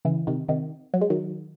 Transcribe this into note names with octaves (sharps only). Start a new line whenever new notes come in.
C#3 E3
C3 D#3
C3 D#3
F#3
G#3
D#3 F#3